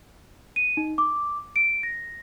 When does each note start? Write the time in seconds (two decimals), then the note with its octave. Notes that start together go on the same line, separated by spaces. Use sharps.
0.56 D#7
0.77 D#4
0.98 D6
1.56 D7
1.83 A#6